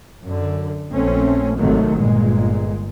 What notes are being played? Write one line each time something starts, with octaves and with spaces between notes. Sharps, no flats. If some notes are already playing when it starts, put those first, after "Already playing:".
F#2 D3
A#1 A3 C4 C#4
G#1 C3 D#3 F#3 A3
G1 A#2 G#3